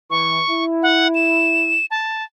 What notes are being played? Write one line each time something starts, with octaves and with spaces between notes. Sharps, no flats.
E3 C#6
E4
F#5
E7
A5